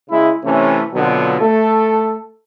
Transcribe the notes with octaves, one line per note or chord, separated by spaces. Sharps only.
C#3 G#3 E4
C3 E3 A3 C#4
B2 D3 F#3 C4 F4
A3 A4